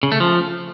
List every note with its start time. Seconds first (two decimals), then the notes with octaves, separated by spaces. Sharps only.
0.03 C#3
0.12 A3
0.20 F3